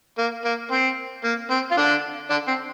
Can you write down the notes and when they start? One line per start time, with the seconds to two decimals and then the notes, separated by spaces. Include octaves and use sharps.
0.18 A#3
0.45 A#3
0.71 C4
1.24 A#3
1.50 C4
1.71 F4
1.77 D3 D4
2.30 D3 D4
2.48 C4